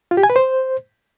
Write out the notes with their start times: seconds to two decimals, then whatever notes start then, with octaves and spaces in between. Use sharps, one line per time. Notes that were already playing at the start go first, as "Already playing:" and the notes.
0.11 F4
0.17 G4
0.23 G#5
0.30 B4
0.36 C5